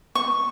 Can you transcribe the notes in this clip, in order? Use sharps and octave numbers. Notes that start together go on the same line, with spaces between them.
C#6